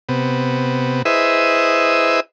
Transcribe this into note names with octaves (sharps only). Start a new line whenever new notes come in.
C3 B3
E4 G#4 B4 C5 D#5 E5